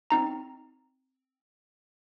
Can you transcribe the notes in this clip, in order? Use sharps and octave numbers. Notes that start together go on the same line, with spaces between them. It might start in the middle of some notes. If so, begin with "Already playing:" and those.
C4 D#4 A#5